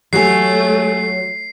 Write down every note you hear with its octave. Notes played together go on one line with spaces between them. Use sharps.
F#3 A3 G4 C#5 G#5 C7